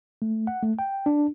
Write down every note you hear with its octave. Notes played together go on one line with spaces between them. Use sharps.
A3
F#5
A3
G5
D4